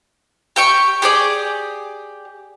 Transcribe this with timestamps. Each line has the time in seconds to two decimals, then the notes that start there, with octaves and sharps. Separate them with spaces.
0.56 G4 G5 C#6
1.02 G4 G#4 D5